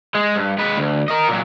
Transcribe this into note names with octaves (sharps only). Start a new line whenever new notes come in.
G#3
G2
G#3 B4
D2
A#4 D#5
A#2 F#3